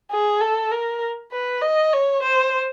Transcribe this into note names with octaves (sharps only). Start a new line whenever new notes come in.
G#4
A4
A#4
B4
D#5
C#5
C5